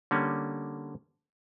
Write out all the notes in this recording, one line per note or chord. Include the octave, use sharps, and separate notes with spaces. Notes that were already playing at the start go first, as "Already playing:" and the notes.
D3 G3 A#3 C#4